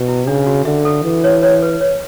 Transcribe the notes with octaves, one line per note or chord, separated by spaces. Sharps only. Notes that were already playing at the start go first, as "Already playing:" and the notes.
Already playing: B2
E4
C#3 D4
F#4
D3 E5
A4
E3
C#5
C#5
B4
C#5